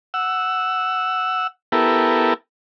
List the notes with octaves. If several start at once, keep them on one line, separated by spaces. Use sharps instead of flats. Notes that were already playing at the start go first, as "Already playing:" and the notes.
F#5 E6
B3 E4 G4 A4 A#4